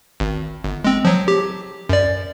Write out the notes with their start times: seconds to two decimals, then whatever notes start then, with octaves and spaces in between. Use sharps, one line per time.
0.20 G#1
0.64 G1
0.85 G#3 C4
1.05 F3 F#3
1.28 G4
1.89 F#2 D5